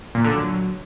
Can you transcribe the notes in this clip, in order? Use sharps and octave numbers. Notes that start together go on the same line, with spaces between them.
A#2
D3
F#3